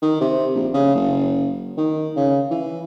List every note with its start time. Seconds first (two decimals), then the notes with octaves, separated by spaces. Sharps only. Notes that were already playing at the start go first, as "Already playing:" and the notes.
0.02 D#3
0.21 C3
0.55 A#1
0.74 C#3
0.95 F#1
1.78 D#3
2.16 C#3
2.51 E3